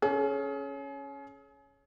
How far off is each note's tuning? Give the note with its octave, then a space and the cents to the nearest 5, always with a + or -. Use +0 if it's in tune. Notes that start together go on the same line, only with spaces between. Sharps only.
C#4 +0 G#4 +35